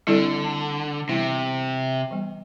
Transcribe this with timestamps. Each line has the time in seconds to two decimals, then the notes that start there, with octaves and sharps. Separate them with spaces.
0.07 D3 G3 C4 E4 A4 D5
1.09 C3 E3 G3 B3 E4
2.11 E3 G3 B3